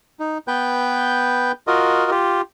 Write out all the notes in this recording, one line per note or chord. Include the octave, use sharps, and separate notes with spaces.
D#4
B3 B4 G5 G6
F4 F#4 A#4 D#5
F4 G4